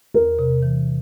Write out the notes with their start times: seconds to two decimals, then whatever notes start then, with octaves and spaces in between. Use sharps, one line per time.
0.14 E2 A#4
0.39 C3
0.62 E3